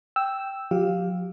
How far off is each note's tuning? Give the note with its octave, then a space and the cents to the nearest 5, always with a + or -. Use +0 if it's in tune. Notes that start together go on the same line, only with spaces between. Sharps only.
G5 +0 E6 +0
F3 +45 G4 +0 F5 +10